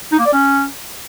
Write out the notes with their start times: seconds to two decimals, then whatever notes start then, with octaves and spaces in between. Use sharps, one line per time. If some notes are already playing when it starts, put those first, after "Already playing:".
0.12 D#4
0.19 A#3
0.26 D5
0.33 C#4